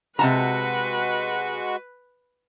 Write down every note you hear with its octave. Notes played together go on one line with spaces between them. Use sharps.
C3 G#3 F#4 B4 A5 A#5 C#6